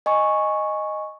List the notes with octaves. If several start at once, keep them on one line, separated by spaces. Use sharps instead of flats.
D#5 G#5 C#6